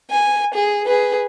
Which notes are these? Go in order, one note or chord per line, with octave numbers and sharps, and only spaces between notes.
G#5
G#4
G#4 B4